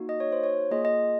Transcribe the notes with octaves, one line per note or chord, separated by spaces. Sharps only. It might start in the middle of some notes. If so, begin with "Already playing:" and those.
Already playing: A#3 D#4 F#4
D#5
C#5
C5
C#5
A#3 F4 G#4 D#5
D#5